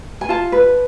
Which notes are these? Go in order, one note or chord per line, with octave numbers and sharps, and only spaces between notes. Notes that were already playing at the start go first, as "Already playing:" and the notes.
G#5
F4 A5
B4